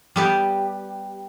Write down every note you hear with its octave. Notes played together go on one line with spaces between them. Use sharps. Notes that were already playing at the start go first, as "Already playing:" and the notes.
G3 B3 G4